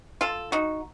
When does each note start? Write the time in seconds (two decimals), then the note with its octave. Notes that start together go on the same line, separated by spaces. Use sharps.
0.21 F4 A4
0.52 D#4 F#4